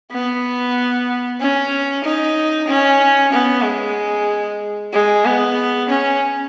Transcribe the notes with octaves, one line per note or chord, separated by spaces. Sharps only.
B3
C#4
D#4
C#4
B3
G#3
G#3
B3
C#4